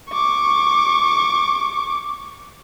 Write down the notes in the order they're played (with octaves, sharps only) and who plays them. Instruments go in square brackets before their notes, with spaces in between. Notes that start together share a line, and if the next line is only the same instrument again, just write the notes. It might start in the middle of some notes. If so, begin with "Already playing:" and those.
[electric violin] C#6 D6